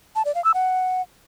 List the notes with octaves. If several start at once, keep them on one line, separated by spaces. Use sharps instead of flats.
A5
D5
F5
E6
F#5